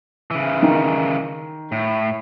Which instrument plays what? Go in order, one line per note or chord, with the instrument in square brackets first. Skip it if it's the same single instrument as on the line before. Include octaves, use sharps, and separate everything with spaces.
[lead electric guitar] C#3 E3
[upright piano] D#3
[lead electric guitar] A2